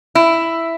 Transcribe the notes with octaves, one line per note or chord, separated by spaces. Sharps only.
E4